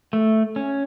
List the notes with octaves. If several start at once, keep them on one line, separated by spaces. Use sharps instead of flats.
A3
C#4